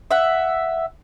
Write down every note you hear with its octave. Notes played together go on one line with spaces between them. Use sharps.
E5 F#5